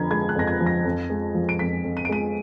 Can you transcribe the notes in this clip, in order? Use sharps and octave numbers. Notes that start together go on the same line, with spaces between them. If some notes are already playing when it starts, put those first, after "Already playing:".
Already playing: F2 D3 F3 A#5 B5 G#6
G#3 G#6
F#6
F2 A#6
G#6
F3
A#6
F2
G#3
F3
D7
F2 B6
F2
D#7
D7
G#3 D#7